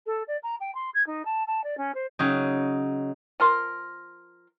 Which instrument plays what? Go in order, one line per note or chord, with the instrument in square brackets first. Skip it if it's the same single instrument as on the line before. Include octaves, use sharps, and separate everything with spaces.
[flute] A4
D5
A#5
G5
C6
G#6
D#4
A5
A5
D5
C#4
C5
[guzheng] C#3 F#3 D#4
[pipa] F3 A#4 C6